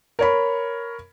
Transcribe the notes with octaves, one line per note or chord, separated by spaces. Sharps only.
A#4 C#5 B5